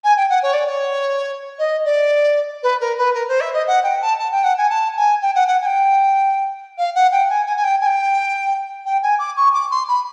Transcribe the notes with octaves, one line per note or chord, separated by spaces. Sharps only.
G#5
G5
F#5
C#5
D5
D5
C#5
D#5
D5
B4
A#4
B4
A#4
C5
E5
D#5
F#5
G5
A5
A5
G5
F#5
G#5
A5
G#5
G5
F#5
F#5
G#5
G5
F5
F#5
G5
G#5
G#5
G#5
G5
G#5
G5
G5
G#5
D6
C#6
D6
C6
B5